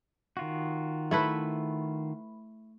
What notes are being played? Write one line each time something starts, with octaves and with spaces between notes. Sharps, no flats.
D#3 F4 F#4
A3 E4 B4